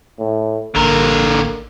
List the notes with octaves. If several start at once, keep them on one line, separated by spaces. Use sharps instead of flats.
A2
A1 D3 A#3 A#4